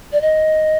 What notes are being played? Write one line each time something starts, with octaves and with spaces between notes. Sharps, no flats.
D5
D#5